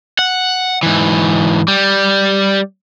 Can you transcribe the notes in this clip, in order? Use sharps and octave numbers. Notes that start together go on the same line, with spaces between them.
F#5
G#2 E3
G3